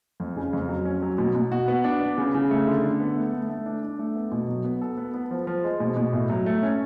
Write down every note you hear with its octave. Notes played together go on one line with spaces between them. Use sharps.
F2
C#3
F2
F#3
C#4
F#3
B2
B2
F#4
B3
D4
B3
C#3
C#3
A3
D3
D3
B3
A3
A3
A3
D4
D4
A3
B3
B2
F#3
B3
A4
B3
B3
F3
F3
G#3
B2
B2
A2
F#3
A3
C#4